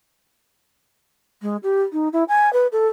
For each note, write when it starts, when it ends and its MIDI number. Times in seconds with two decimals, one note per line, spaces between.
1.42 1.57 56
1.63 1.82 67
1.93 2.08 63
2.12 2.24 64
2.28 2.52 80
2.53 2.67 71
2.72 2.88 69